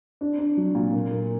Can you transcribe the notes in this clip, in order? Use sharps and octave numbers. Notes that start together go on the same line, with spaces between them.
D4
D4
F#3
A#2
A#3
A#3